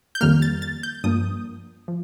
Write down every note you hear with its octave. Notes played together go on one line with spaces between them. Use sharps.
G6
F2 D#3 G3 A#3 F6
A6
A6
G6
G2 F3 A#3 D#6
F3